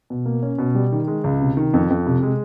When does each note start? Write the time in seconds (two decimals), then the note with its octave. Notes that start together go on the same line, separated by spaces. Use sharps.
0.10 B2
0.26 A#3
0.43 C#4
0.59 B2
0.75 G3
0.92 D#3
1.08 G#3
1.24 C#2
1.41 C3
1.57 D#3
1.73 F2
1.90 F2
2.06 C3
2.23 G#3